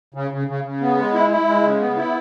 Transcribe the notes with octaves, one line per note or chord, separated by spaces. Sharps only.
C#3
C#3
C#3
C#3
B3
G#3
E4
E4
G#3
C#3
B3
E4